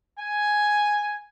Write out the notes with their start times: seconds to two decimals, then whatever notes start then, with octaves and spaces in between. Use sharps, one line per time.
0.19 G#5